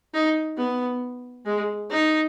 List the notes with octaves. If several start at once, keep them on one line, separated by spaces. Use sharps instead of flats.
D#4
B3
G#3
D#4